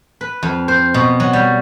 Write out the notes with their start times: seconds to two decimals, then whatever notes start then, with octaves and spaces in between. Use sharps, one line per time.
0.21 B4
0.43 F2
0.68 C5
0.94 B2
1.20 F#3
1.33 G3